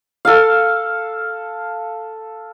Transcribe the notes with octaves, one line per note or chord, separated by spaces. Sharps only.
A4 F5